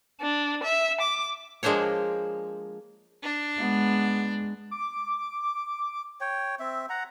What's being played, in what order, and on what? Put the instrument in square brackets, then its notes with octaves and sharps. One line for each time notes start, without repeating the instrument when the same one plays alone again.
[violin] D4
E5
D6
[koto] F3 G#3 A#3 D4 C5 C#5
[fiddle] D4
[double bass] G#3 [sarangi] B3
[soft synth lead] D6
[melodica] C#5 G5
C4 E5
F#5 A#5